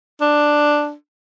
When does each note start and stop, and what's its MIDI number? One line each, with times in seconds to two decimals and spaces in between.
0.21 0.93 62